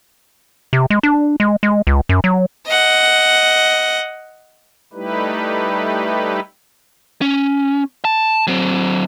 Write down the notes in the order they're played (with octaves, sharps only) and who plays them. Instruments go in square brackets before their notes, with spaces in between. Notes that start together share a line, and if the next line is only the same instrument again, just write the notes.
[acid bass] C3
G#3
D4
G#3
G#3
C#2
F#2
F#3
[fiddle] D#5 F#5
[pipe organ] G3 A3 D#4 E4 G4 B4
[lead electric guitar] C#4
A5
F#3 C4